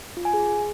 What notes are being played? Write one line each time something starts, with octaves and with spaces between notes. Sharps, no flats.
F4
G#5
G#4